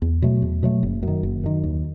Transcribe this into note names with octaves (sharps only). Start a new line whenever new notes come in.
E2
B2 F#3 A3
E2
B2 F#3 A3
F#1
F#2 D#3
F#1
F#2 D#3
D#2